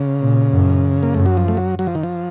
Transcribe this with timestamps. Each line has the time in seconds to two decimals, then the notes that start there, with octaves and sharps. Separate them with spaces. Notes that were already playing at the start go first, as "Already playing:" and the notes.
Already playing: C#3
0.21 A#2
0.53 F#2
1.03 A#3
1.14 F#2 A3
1.26 F#3
1.37 F3
1.48 A3
1.57 F#3
1.79 F#3
1.87 F3
1.95 D#3
2.03 F3